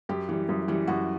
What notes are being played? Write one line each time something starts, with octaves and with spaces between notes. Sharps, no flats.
F#2 G4
E3 G3
F#2
E3 G3
F#2 F#4